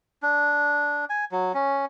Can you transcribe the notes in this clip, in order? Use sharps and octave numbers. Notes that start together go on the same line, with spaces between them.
D4
G#5
F#3
C#4